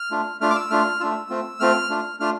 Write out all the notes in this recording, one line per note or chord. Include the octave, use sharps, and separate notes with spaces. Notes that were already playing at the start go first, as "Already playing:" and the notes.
Already playing: F6
A3 D4 F4
A3 D4 F4 F6
D6
E6
A3 D4 F4 F6
A3 D4 F4 E6
A3 C4 F4
A3 C4 F4 F6
A3 D4 F4
A3 D4 F4 F6